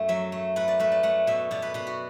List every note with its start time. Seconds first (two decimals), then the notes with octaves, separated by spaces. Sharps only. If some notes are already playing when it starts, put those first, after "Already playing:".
Already playing: F#2 A3
0.09 F#3 E5
0.32 A3
0.56 A3 B4
0.68 D5
0.80 A3 B4
0.92 D5
1.03 A3 F#5
1.27 B2 E5
1.51 B2 D5
1.62 B4
1.74 B2 B4
1.87 F#4